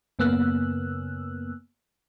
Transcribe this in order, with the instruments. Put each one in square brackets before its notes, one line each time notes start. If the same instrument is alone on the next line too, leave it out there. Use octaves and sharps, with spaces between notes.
[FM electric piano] F#2 C#3 A#3 B3 E6 F#6